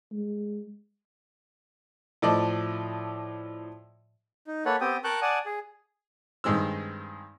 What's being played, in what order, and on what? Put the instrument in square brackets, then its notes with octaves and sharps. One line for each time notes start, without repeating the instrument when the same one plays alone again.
[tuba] G#3
[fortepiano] A2 F3 D5 D#5 A5
[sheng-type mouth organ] D#4
A#3 A4 B4 C#5 F#5
B3 C4 G4 G5 D#6
A#4 G5 A5 C#6 F#6 G6
D5 F#5 G#5 A5 D#6
G#4
[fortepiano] G2 D#3 G#3 C4 E6